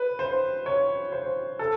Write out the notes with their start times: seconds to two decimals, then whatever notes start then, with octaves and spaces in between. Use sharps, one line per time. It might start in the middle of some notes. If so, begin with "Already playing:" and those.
Already playing: B4
0.19 C5
0.66 C#5
1.12 C5
1.59 A4